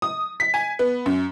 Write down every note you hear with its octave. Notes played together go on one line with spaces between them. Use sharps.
D#6
B6
G#5
B3
F#2